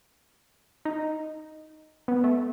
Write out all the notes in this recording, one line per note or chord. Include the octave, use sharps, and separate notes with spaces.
D#4
B3
A3